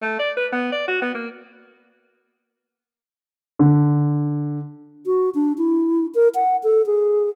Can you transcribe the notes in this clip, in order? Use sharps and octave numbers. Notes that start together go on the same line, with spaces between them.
A3
D5
B4
B3
D5
F#4
B3
A#3
D3
F#4
D4
E4
A#4
F#5
A4
G#4